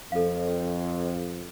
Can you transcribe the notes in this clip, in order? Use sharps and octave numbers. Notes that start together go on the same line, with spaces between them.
F2 A4 F5